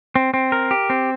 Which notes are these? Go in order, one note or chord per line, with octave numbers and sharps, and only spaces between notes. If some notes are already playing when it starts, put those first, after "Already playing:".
C4
C4
A#4
G4
C4